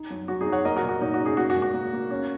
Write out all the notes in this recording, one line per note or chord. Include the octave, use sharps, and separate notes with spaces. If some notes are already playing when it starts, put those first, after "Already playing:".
Already playing: D#4
F#2
F#2 F#4
D#4 G#4
F#2
C#5 F#5
A#3 A#4 D#5
F#4 A#4
A#2
F#4 A#4
A#2 D#4
F#4
C#4
D#4 G#4
A#3 F#4
F#4
G#2
F#4
A#3
A#3
C#4